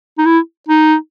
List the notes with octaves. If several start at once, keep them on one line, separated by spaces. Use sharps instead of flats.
D#4
E4
D#4